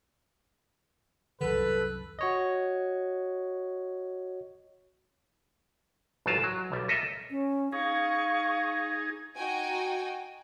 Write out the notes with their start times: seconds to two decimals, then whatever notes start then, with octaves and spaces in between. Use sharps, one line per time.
1.41 C2 F#2 D#3 A4 B4
2.19 F#4 C#5 D#5
6.26 A1 G#2 F#3 F4 A#4 A5
6.42 F#3 A#5
6.72 B1 G3
6.88 A4 A#4 D#5 E5
7.31 C#4
7.73 D#4 G#4 F5 C#6
9.35 D#4 F#4 G5 G#5